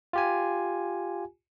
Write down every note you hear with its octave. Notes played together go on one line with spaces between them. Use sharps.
F4 G4 G#5